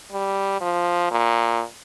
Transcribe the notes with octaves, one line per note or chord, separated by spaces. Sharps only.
G3
F3
A#2